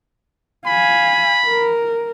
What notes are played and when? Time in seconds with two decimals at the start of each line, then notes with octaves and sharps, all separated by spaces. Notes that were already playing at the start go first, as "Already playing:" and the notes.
0.67 F5 G#5 B5
1.47 A#4